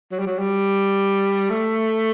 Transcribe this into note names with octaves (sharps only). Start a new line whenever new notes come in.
F#3
G3
F#3
G3
A3